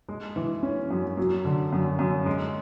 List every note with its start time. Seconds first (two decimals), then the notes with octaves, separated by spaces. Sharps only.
0.09 G#3
0.36 E3
0.63 C#4
0.91 F#2
1.17 F#3
1.45 D3
1.73 F#2
1.99 F#2
2.26 G#3